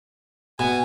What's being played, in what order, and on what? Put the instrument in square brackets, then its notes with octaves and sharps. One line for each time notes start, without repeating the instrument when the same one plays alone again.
[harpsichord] B2 [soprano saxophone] G#5